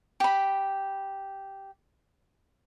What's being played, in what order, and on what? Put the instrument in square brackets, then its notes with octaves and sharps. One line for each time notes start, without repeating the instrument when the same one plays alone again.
[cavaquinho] G4 B5